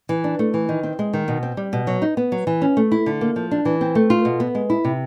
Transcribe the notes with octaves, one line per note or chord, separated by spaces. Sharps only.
E3
D4
A3
E3
D#3
C4
G#3
D#3
B2
C4
G3
B2
F#3
D#4
B3
F#3
E3
C#4
A3
E4
D3
A#3
F3
D4
E3
C4
A3
F4
B2
B3
G#3
E4
C3